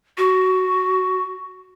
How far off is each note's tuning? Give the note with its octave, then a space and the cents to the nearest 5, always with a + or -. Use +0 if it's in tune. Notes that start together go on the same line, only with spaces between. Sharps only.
F#4 +10